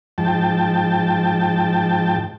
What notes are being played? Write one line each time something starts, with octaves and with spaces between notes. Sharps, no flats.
G#2 F3 G5 A5